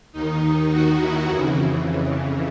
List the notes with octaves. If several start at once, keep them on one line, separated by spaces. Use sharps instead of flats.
D#2 D#3 D#4
F#4
E4
F2 C#3 E3